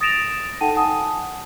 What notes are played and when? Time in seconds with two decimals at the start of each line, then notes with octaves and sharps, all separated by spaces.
0.01 D#6 A6 A#6 D7 E7 F7
0.61 D#4 A4 F#5 G5 A5 D#7
0.75 F#5 G#5 A5 D#6